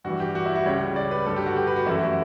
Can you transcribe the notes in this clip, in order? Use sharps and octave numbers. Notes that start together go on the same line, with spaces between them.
G2 E3 G3 F#4
G4
F#4
E4
F#4
C#2 C#3 G3 C#5
D5
B4
G2 D3 G3 A4
G4
F#4
G4
B4
F#4
F#2 E3 A3 E4
F#4